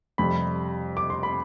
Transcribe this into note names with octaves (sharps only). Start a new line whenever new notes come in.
F2 C3 G3 B5
D6
C6
B5